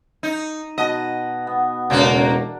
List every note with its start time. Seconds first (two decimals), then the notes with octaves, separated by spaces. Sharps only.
0.23 D#4
0.78 B2 D#5 F#5 A5
1.47 B3
1.90 E1 C#3 A#3 D4 F#4 A#4